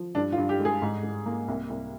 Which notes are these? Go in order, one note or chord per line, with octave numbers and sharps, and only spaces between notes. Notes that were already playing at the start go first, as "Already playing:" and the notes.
Already playing: F3
G2 D4
F4
G2
G4
G#3
G#4
G#2
G#2
A#3
C2
C2